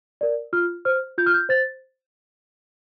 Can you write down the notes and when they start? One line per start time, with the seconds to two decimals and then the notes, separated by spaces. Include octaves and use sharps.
0.21 A#4 D5
0.53 F4 F6
0.85 C5 F6
1.18 F4 G6
1.26 F6
1.34 G6
1.49 C5 A6